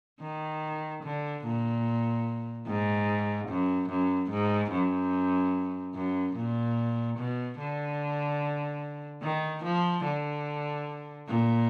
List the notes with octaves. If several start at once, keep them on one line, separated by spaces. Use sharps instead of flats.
D#3
D3
A#2
G#2
F#2
F#2
G#2
F#2
F#2
A#2
B2
D3
D#3
F3
D3
A#2